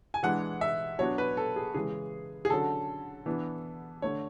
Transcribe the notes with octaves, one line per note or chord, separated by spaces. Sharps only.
G#5
E3 G#3 D4 F#5
E5
F#3 B3 D4 C#5
B4
A4
G#4
C#3 E3 G#3 G#4
G#4
D3 F#3 C#4 A4
E3 B3 D4
D3 A3 D4 C#5